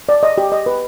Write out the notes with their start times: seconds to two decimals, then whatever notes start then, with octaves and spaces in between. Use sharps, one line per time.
0.09 D5
0.23 D#5
0.38 G4
0.52 D#5
0.66 B4